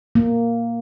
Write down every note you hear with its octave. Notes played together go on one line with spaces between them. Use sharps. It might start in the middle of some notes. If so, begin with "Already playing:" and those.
A#3